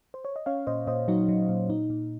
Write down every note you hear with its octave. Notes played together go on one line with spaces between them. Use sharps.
C5
C#5
D#5
C#4 C#5 F5
A#2 C5 D#5
A#2 C5 D#5
F#3 D#4 F#4
F#3
A#2
A#2 D#4
A#2